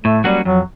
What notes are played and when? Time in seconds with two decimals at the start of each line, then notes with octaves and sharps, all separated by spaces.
0.04 A2 A3
0.24 F#3 G3 A#3 C#4 F#4
0.45 F2 F#3